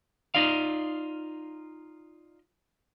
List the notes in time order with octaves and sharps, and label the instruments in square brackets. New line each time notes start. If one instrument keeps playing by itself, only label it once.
[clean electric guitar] D#4 F4 D5 F5